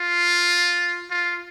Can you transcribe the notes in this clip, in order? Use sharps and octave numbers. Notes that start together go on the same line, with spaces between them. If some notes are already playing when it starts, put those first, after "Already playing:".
Already playing: F4
F4